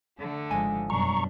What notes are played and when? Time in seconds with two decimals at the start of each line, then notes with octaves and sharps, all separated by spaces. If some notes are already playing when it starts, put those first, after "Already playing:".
0.19 D3 A3
0.51 G#1 F3 G#3 G#5
0.90 F#2 B2 G3 D4 A#5 C#6